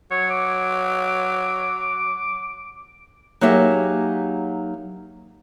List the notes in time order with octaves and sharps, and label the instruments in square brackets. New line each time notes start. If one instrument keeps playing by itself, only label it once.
[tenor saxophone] F#3 [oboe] C#5
[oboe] D6
[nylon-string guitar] F#3 A#3 D#4 G4 G#4 E5